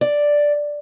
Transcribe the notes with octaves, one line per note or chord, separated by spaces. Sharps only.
D5